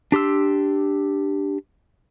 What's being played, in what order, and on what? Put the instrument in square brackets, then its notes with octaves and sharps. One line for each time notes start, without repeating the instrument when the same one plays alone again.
[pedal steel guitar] D4 G4 C6 E6